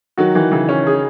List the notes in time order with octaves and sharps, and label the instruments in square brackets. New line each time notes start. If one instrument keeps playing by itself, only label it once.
[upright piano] D#3 F#3 [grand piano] F#4
[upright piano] D#3 [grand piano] E3
[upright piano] C#3 [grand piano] E3
[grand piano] C#4
G#4